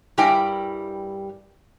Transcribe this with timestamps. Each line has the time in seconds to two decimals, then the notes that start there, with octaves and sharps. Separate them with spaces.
0.18 G2 G3 E4 A#4 G5 G#5